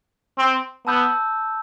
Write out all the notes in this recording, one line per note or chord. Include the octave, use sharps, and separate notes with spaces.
C4
B3 A5 E6 G6